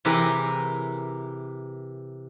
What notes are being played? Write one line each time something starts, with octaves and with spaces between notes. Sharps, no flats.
C3 E3 G4 G#4 A#4 B4